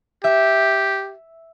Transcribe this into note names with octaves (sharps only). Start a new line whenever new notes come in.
G4 E5